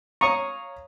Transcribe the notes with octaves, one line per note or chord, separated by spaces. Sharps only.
C#5 F5 A#5 C#6 D#6